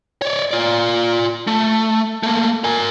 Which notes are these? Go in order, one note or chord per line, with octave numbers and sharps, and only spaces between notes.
C#5 D5
F4 D5
A3
A3 A#3
A#4 G#5